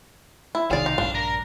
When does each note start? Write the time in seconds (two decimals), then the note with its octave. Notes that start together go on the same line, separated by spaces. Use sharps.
0.55 E4
0.71 B1 C3 D#3 G#4 D5 F5
0.86 D#4
0.98 A#1 G2 D4
1.15 A#4